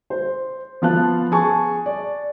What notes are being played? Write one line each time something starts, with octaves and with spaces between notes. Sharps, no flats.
C5
F3 B3 F4 F5 A5 F#6
G#4 G#5 A5 C#6
D5